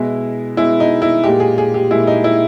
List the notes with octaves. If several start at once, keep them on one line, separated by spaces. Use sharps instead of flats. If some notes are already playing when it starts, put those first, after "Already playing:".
Already playing: B2 G#3 E4
B2 G#3 E4
D#4
E4
A#2 G#3 G4
G#4
G#4
G4
A#2 G#3 E4
D#4
E4